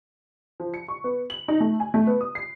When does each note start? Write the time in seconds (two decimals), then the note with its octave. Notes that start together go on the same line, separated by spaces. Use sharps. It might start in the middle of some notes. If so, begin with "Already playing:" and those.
0.60 F3
0.74 C#7
0.88 C#6
1.04 B3
1.30 F#7
1.48 D#4
1.60 A3
1.80 G#5
1.94 A3
2.07 B3
2.21 D#6
2.35 C7